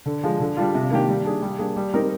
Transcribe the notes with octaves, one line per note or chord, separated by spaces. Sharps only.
D3
F3 G#3
D3
G3 D4 F4
C3
D#3 A#3 D4 G4
G3
D4 G#4
G3
A#3 D4 G#4
G3
C4 D#4 G4 A#4